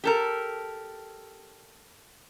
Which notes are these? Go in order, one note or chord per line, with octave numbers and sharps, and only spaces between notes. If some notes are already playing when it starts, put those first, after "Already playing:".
G4 A4 A#4